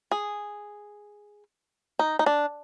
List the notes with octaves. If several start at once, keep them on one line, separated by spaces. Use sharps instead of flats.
G#4
D#4
D#4
D4